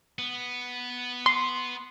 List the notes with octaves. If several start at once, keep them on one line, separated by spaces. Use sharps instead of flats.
B3
C6